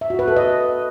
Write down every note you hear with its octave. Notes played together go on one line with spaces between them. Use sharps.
E5
F#4
B4
A4
D#5